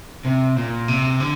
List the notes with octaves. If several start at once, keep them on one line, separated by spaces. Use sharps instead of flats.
C3
A#2
C3
D3